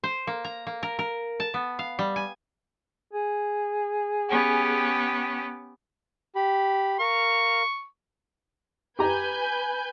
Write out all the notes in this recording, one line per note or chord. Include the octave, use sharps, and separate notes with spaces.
C5
A#3
A#5
A#3
A#4
A#4
A5
B3
F5
G3
G#5
G#4
B3 C#4 G4
G4 B5
A#4 F5 C#6
G4 B4 G#5 A#5 G6